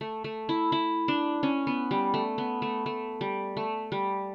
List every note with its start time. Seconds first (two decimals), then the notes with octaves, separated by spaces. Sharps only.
0.01 A3
0.24 A3
0.49 E4
0.72 E4
1.08 D4
1.43 C#4
1.67 B3
1.91 G3
2.14 A3
2.38 B3
2.62 A3
2.86 A3
3.21 G3
3.57 A3
3.92 G3